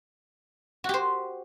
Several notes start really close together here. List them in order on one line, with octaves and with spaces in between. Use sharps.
F#4 G4 C5